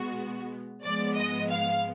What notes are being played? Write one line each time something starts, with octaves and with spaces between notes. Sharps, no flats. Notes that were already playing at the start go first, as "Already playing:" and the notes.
Already playing: B2 G#3 B3 F#4
G#2 F3 G#3 B3 D5
D#5
F5